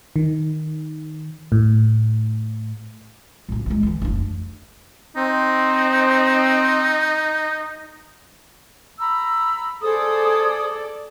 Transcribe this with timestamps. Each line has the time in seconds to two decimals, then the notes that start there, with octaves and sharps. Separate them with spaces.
0.16 D#3
1.52 A2
3.49 D1 C#2
3.66 F3 G#3
3.83 D3 E3
4.02 F1 D4
5.16 C4 D#4
8.99 A#5 B5 E6
9.82 G#4 A4 C5 D5 D#6